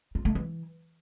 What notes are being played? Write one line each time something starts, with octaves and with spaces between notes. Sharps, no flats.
F4
A3
E3